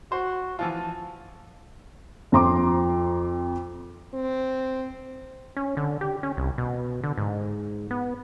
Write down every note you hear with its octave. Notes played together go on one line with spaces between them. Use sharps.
F#4 C5
E3 F3 F4 A5
F2 C5 A#5 C6 D6
C4
C#4
D3
G4
C#4
C2
B2
D3
G#2
B3